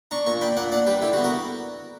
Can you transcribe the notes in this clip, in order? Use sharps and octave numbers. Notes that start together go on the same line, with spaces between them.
D4 A#5 C#6
A#2 A#5 C#6
D4 G5 B5
A#2 D5 F#5
D4 D5 F#5
G3 G4 B4
D3 E4 G4
F#4
B3
F#4 A#4